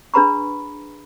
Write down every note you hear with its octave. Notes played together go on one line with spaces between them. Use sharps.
D4 G#4 B4 A#5 B5 C#6